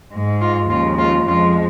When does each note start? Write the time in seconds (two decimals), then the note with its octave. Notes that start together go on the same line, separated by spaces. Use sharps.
0.13 G#2 G#3
0.40 F4
0.69 D#2 C#3 F3 G#3 F4
0.98 F4
1.27 F2 F3 G#3 F4